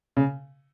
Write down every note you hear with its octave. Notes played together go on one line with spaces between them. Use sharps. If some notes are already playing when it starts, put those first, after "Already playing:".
C#3